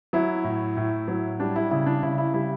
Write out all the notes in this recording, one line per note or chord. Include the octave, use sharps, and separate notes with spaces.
F#3 E4
A2
A2
F#3
G3 D4
E4
C#3 E4
D4
C#3 E4
E4
G3 E4